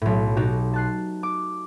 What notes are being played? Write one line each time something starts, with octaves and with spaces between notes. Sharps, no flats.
B1 A2
B2 D#4 F#4 G4
A5 F#6 C7
D6